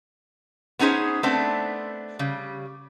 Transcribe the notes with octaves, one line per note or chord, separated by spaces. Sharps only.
B3 C#4 D#4 G#4 C5
A3 B3 C4 D4
C#3 G3